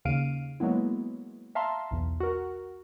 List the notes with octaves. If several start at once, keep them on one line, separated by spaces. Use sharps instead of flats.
D#2 C#3 F5 D7 D#7
F#3 G#3 A#3 B3 E4
E5 F5 A5 A#5 C6
B1 E2
F#4 A#4